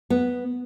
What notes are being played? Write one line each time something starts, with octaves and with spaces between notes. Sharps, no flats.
B3